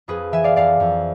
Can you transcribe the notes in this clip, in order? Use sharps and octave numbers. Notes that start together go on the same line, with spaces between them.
F2 G#4 B4
E3 E5 G#5
D5 F5
F2 D5 F5
F2